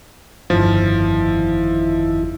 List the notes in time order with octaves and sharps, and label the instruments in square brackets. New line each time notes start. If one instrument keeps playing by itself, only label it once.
[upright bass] G1 [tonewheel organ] F2 D#3 E4 [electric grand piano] F3